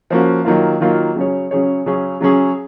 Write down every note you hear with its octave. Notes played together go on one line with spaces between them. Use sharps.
F3 A#3 C#4 F#4
D#3 F#3 A#3 F4
D#3 F#3 A#3 F4
C#3 F#3 C#4 G#4 C#5
C#3 F#3 C#4 G#4 C#5
C#3 F#3 C#4 G#4
C#3 F#3 C#4 G#4